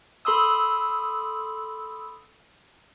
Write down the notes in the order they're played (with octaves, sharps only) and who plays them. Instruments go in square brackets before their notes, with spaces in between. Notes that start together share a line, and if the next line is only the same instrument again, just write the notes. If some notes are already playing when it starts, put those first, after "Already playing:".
[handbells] A4 B5 C6 D#6 E6